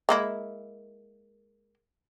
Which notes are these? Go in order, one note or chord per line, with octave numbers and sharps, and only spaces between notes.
G#3 A#3 E4